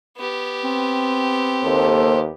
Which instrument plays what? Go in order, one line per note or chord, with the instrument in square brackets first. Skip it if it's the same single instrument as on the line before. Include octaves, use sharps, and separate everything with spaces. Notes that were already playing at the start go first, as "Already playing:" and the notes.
[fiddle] B3 G4
[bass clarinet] C4
[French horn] D#2 [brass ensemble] A#3 A4 C5